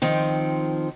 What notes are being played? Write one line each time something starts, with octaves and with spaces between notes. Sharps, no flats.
D#3 F3 C4